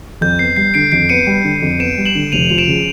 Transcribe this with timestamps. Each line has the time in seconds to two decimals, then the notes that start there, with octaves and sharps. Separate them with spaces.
0.21 F2 G6
0.39 B3 C7
0.56 G3 C7
0.74 D3 C7 D7
0.92 F2 C7 D7
1.09 B3 C#7 D#7
1.27 G3
1.44 D3
1.62 F2
1.79 B3 D7 E7
1.97 G3
2.06 E7 F#7
2.15 D3
2.32 F1 D#7 F7
2.49 F3 F7
2.58 D7 E7
2.68 C#3